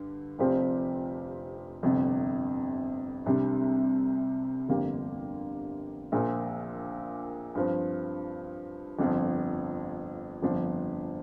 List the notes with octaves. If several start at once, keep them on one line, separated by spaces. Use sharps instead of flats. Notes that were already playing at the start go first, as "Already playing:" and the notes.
Already playing: G2 D3
F1 F2 F3 C4 G4
G1 F2 C3
C2 C3 G3 D4
G1 F2 D3 A#3 G4
A#1 A#2 F3 A#3
G2 F3 C4
G1 F2 F3
G1 F2 F3 D4